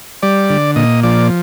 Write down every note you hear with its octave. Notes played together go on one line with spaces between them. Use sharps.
G3 D5
D3
A#2 D#5
F3 D5